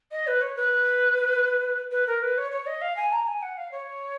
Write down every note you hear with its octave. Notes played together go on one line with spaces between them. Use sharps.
D#5
B4
C#5
B4
B4
A#4
B4
C#5
C#5
D#5
F5
G#5
A#5
G#5
F#5
F5
C#5